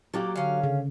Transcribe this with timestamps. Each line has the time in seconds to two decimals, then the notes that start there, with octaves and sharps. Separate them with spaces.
0.14 F#3 A#3 G4 A4
0.36 D3 C#4 F5
0.63 C#3